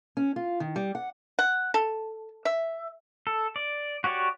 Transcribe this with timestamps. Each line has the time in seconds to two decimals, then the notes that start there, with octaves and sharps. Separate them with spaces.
0.17 C#4
0.36 F4
0.60 D#3
0.76 G3
0.95 F#5
1.39 F#5
1.74 A4
2.45 E5
3.27 A4
3.56 D5
4.04 F#4 G4 C#5 D5